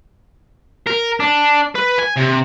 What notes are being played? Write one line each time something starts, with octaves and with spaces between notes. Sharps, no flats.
A#4
D4
B4
G#5
C3